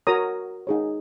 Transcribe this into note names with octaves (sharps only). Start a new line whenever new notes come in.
F#4 A#4 C#5 A#5 D#6
D#4 G#4 C#5